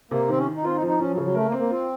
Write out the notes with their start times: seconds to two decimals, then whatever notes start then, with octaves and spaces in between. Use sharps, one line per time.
0.11 C3 A#3
0.29 D#3 C4
0.38 C#4
0.47 D#3
0.56 D#4
0.64 C4 F4
0.76 D#4
0.82 F3
0.87 D#4
0.99 F3 C#4
1.11 F#3
1.17 C#3
1.23 F#3
1.34 A3 A#4
1.46 A#3
1.52 C4
1.58 A#3
1.69 C4 F4